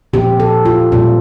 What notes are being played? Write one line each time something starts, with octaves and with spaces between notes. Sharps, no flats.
A#2 F3 C4 G4
A4
F4
A#2 G3 C4 F4